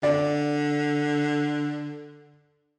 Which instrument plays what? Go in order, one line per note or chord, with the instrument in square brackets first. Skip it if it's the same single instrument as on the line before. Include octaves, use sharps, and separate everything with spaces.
[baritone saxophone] D3 [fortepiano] D5